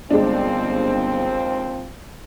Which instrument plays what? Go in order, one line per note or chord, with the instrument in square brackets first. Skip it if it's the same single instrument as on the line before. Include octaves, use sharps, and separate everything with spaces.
[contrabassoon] G1 [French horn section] D#2 F3 C4 [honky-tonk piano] G#3 D4